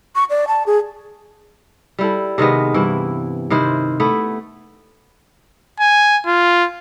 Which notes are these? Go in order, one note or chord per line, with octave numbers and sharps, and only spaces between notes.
C#6
D5
A5
G#4
G3 E4 A4
C3 D#3 G#3 B3
G2 E3 E4
C3 D#3 E4 C5
A3 B3 E4
G#5
F4